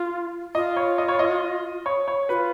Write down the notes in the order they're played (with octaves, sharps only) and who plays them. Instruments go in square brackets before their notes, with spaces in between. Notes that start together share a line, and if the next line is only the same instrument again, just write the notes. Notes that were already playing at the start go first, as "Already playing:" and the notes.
Already playing: [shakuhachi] F4
[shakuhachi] F4 [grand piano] D#5
[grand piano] C#5
D#5
C#5
D#5
C#5
C#5
[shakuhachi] F#4 [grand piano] B4
[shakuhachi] F4